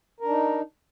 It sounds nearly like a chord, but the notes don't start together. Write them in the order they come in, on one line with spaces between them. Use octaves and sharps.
A#4 D4 D#4